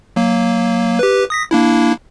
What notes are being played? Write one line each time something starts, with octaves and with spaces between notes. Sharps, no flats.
F#3 A#3
G4 B4
D#6 A#6 B6
A#3 D4 E4